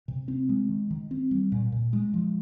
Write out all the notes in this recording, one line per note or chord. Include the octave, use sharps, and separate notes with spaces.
C3
C4
G#3
D#3
D#3
C4
G3
A#2
A#2
G#3
F3